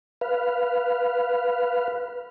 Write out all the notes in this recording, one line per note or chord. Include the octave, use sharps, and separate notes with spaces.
B4 F5